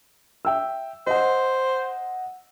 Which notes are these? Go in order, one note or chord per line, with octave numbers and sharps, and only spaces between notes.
E5 G5 E6
C5 D#5 F#5